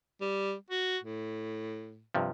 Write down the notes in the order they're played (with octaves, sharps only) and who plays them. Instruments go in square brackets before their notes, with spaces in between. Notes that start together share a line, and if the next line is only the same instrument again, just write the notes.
[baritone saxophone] G3
F#4
A2
[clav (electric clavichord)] G2 C3 F3